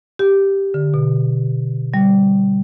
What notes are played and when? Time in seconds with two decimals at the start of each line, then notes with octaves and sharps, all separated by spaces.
0.19 G4
0.74 D3
0.94 B2
1.94 G3